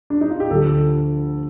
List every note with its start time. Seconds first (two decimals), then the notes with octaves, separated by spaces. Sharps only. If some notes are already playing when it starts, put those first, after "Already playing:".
0.10 D4
0.21 D#4
0.30 F4
0.40 G4
0.50 D2 D3 F3 A4